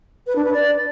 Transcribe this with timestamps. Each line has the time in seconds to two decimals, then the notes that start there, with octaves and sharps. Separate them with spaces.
0.27 B4
0.36 D4
0.44 B4
0.53 D5